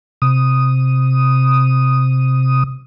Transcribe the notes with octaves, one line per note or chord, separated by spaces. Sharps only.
C3 D#6